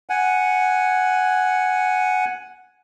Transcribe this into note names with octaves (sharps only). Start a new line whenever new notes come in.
F#5 G#5